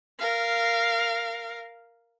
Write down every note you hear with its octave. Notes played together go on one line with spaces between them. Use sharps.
A#4 F5